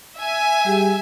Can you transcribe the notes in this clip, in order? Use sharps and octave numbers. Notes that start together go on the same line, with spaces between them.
E5 G#5
G3 G4 G#4